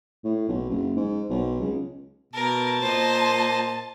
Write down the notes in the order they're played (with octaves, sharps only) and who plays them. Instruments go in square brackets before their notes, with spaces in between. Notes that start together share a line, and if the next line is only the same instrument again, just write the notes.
[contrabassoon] A2
B1
F#1
G#2
B1
C#2
[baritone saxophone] B2 [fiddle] A#4 [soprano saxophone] A5
[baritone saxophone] A#2 [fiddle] C5 D#5